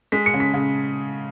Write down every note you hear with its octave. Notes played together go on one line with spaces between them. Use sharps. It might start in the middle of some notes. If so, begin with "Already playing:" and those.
G#3 B6
C#7
C#3
B6
C#3